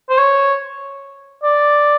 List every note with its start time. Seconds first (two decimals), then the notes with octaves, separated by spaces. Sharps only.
0.09 C5
0.18 C#5
1.43 D5